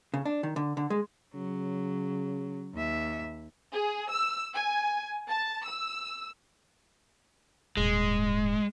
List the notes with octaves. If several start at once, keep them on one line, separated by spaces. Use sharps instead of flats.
C#3
D4
D#3
D3
D3
G#3
C#3 F#3
D#2 E5
G#4
E6
G#5
A5
E6
D#1 G#2 G#3